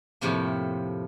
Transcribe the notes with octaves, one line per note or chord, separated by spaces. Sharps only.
F2 A2 C3 A#3